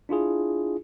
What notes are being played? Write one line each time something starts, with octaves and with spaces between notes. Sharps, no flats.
D4 E4 F4 G#4